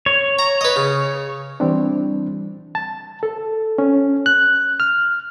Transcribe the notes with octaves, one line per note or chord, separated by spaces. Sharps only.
C#5
A#5
B4 D#5
C#3
E3 G3 C4 D4
A5
A4
C#4
F#6
F6